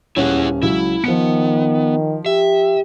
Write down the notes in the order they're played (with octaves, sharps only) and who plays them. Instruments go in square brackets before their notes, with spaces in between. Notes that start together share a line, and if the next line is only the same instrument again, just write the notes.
[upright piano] D#1 C#4 [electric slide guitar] E4 G#4 F#5
[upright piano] C#2 F#3 [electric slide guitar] E4
[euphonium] D#3 [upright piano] F3 C#7 [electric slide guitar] B3
[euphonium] G4 [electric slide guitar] E5